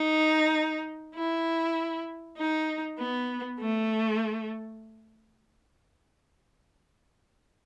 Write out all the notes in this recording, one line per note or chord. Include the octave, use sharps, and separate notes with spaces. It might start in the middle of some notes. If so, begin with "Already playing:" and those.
Already playing: D#4
E4
D#4
B3
A3